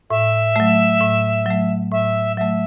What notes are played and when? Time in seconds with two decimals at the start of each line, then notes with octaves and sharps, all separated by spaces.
0.10 A2 E5
0.56 F#3 A3
1.01 A2
1.46 F#3 A3
1.91 A2 E5
2.37 F#3 A3 E5